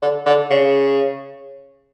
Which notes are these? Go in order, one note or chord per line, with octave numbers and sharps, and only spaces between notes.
D3
D3
C#3